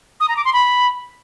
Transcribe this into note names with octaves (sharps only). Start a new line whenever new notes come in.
D#6
A#5
D6
C6
B5